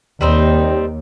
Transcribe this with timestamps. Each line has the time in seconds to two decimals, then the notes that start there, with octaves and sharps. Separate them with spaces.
0.21 D#2 G3 C4 D#4